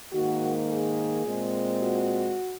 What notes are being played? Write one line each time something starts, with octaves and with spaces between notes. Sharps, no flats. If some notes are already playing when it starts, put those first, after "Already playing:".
G#2 D#3 A#3 F#4
G#4
A#2 G#3 C4
F#4